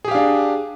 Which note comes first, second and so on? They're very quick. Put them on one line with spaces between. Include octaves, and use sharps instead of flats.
G#4 G4 F5 D4